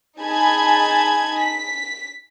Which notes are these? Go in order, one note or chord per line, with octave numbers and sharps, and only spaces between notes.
D#4 G#4 G#5 A5 B5 G#6
B6